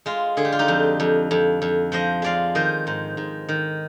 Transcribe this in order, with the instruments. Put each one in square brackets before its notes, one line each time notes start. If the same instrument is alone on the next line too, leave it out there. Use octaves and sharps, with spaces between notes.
[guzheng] G#3 F4
D3 G#4
G4
F4
D#4 G4
F2
F2
F2
F2
F3 C5 D#5
G#3 D5 F5
D#3 C5 D#5
G#2
G#2
D#3